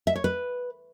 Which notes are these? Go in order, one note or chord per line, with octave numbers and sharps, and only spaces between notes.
E5
C#5
B4